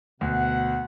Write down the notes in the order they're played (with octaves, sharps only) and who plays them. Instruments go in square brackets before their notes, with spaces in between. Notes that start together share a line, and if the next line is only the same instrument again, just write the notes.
[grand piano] D2 [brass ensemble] B2 F#5